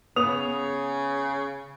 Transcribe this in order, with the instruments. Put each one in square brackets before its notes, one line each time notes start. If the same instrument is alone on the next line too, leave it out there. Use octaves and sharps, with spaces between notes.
[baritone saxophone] C#3 [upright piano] B3 D#6 F7